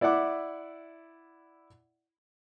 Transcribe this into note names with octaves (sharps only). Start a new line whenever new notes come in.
E4 D5 E5 F#5 D6